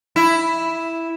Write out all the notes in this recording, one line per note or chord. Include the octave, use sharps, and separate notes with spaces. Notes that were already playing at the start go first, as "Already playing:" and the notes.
E4